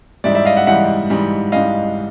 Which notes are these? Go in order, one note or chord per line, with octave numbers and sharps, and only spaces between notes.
G#2 E3 G3 D5 E5
D5 E5
D#5 F5
E5 F#5
G#2 E3 G3 E5 F#5
G#2 E3 G3
G#2 E3 G3 D#5 F5